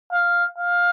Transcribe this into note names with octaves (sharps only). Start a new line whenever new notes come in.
F5
F5